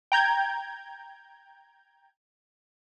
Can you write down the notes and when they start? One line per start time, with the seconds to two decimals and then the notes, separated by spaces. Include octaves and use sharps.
0.12 G5 A#5 G6 G#6